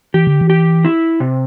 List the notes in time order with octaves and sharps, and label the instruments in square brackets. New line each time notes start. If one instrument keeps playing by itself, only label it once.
[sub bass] E3 [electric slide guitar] G4
[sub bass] D3
E3
[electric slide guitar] G4
E4
C3